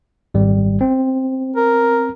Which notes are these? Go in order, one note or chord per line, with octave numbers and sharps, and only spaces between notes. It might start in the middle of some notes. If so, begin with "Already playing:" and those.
G#1 G3
C4
A#4